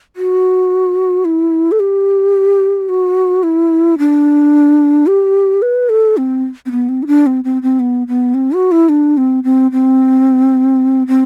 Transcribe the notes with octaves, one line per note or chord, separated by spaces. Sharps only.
F#4
E4
A4
G4
F#4
E4
D4
G4
B4
A4
C4
C4
B3
C4
E4
D4
C4
C4
C4
B3
B3
C4
F#4
E4
D4
C4
C4
C4
C4